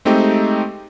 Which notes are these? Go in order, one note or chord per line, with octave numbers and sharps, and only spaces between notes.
G#3 A3 C4 D#4 G4